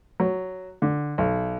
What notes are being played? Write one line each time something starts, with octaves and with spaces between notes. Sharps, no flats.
F#3
D3
B1